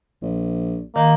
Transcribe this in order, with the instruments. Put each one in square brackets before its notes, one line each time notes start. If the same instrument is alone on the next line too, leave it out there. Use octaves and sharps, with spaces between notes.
[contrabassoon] A#1
[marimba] D#3 [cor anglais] A#3